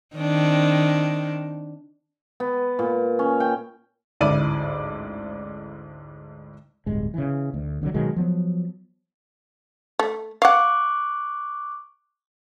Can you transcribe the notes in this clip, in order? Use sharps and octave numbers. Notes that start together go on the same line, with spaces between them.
D#3 C4 D4
B3
A#2
C#4
G5
A1 D2 G#2 E4 D5 D#7
D1 G2 G#3
C#3 E3
D2
C2 D3 E3 F#3
B2 D#3 F#3 G#3
F3 F#3 B3
A3
F5 F#5 C#6 D6 F#6